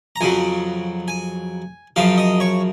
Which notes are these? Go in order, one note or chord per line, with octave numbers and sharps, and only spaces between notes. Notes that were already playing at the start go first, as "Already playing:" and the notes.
A#5
F2 C#3 F#3 G#5
G#5
F#2 C#3 F3 F5
D#5
C#5